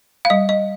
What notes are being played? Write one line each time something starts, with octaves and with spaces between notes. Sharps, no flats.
F5
G3 D#5
D#5